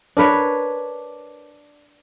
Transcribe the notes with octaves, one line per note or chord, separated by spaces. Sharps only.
D4 A#4 B4 C#5